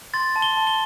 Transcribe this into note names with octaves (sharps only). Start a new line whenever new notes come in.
C6 A6
A5
G7
A5
G7